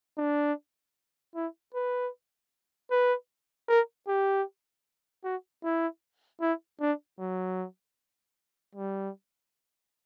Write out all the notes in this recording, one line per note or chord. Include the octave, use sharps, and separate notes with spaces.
D4
E4
B4
B4
A#4
G4
F#4
E4
E4
D4
F#3
G3